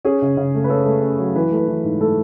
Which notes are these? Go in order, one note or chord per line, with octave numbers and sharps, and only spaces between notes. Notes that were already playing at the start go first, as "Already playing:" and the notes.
C#4 G#4
C#3
C#3
A3
B4
C#4 A4
A3
C#4
F#3
E3 B4
A3 B4
E3
G#2
A3 A4